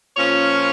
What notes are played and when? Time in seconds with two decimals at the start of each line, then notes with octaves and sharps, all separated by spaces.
0.17 A#2 F3 C#4 C#5